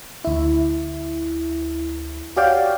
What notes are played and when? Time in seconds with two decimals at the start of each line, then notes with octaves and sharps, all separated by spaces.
0.24 D2 E4
2.36 F#4 G4 C#5 D5 F5 G5